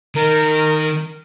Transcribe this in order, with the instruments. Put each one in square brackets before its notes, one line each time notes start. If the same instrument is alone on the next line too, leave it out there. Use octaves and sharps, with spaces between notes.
[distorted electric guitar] D#3 [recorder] A#4